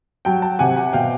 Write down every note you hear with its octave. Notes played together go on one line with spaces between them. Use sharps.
F#3 G5 A5
G5 A5
C3 F#5 G#5
F#5 G#5
B2 F5 G5